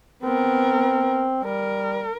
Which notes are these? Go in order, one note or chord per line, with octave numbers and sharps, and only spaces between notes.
B3 C4 A#4
G3 A#4